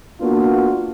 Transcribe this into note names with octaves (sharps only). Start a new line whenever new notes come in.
A#3 B3 D4 F4 F#4